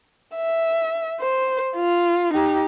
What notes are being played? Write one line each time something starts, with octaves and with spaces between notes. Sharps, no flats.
E5
C5
F4
D#4 G4